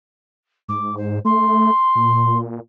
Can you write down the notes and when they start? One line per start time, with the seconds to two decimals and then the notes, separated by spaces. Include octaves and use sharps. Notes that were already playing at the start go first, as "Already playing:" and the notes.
0.68 G#2 D6
0.97 C5
1.25 A3 C6
1.95 A#2